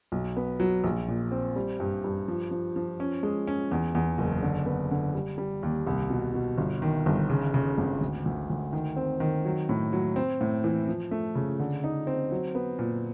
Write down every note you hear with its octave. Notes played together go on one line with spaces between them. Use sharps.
B1
B3
F#3
A#1
A#2
C4
G3
G2
G2
F3
F3
F3
C#4
G#3
C#4
E2
E2
F#1
D3
B3
D3
G3
G3
D#2
C2
B2
B2
G1
D#3
G1
C#3
C#3
G#1
D2
D2
D2
D#3
C4
D#3
F#3
A2
F#3
C4
A2
E3
F3
A3
C#3
D3
D#4
C4
F#3
B3
A#2